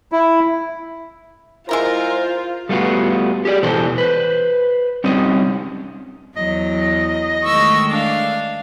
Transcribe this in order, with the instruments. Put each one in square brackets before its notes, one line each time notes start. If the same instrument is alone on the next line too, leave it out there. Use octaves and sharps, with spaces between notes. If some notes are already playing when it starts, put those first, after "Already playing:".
[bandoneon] E4
[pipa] G#3 E4 A#5 [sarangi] F4 [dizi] A#4 [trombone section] C5
[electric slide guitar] G3 A3 B3 F4 F#4
G4 G#4 C#5 D5
B2 E3 A4 C5
B4 C5
G3 C4 C#4 D#4 D#5
[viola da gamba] E2 [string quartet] F#3 [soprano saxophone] D#5
[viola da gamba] D#3 G#3 A3 [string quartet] C#6 E6
[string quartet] D4 F5